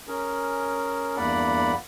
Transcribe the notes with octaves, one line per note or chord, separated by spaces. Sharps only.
C#4 G#4 A#4
E2 G2 A#3 D5 F#5 B5